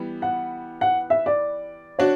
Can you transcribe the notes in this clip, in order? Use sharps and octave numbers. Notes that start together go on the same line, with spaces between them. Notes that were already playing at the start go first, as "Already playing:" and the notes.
Already playing: E3 G3 B3
F#5
F#5
E5
D5
D4 F#4 C#5